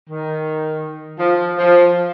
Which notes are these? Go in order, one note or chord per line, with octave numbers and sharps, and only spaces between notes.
D#3
F3
F3